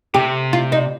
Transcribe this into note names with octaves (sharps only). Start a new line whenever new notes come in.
C3 G4
F4
D#4